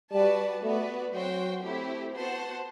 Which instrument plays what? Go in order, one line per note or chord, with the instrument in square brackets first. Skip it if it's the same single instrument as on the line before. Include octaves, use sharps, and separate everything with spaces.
[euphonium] G3 [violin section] F#4 B4 D5 A5
[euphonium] A3 [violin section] B3 F#4 B4 D5
[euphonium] F#3 [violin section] C4 F#4 C5 G5
[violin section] A3 C4 E4 G4
B3 F#4 C5 F#5 A5